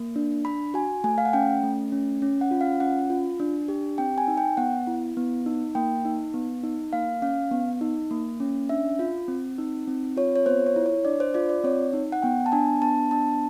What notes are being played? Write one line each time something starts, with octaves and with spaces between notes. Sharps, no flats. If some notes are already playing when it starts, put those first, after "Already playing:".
Already playing: A#3
D4
D4 B5
F#4 G#5
A3 G#5
F5
F#5
C#4 G5
A3
C#4
C#4
F#5
F4
F5
C#4 F#5
F4
D4
G4
C4 G5
G#5
D#4
G5
B3 F#5
E4
B3
D#4
A#3 G5
D#4
B3
D#4
A#3 F5
C#4 F5
B3
D#4
A#3
C#4
D4 E5
F4
C4
D#4
C4
F4 C#5
C#5
B3 C5
C#5
E4
C#5
D4 D5
C5
F4 D5
D5
C4 C#5
D#4
F#5
B3 G5
A5
D4 G#5
B3 A5
D4 A5